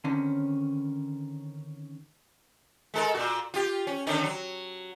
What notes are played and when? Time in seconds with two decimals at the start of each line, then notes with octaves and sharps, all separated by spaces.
0.04 D3 D#3 C4 C#4
2.94 G#3 A4 A#4
3.14 A#2 F#4
3.54 F4 G4
3.87 C#4
4.07 D3 D#3 C#4
4.23 F#3